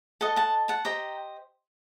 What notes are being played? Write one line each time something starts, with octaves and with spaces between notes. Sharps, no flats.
A4 D#5 F#5 A5
F#5 A5
F#5 A5
G4 C5 D#5 G5 A#5